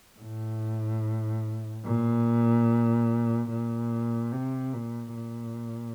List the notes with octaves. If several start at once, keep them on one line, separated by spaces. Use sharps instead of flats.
A2
A#2
A#2
C3
A#2
A#2